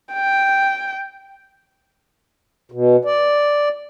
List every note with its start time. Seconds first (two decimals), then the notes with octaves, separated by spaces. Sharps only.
0.13 G5
2.72 B2
3.05 D5